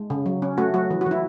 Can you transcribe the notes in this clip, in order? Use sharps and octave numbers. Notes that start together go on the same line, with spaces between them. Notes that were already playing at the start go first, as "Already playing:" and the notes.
Already playing: G#3
C#3
F#3
C#4
A3 F#4
F#3 F#4
E3
F#4
E3
E4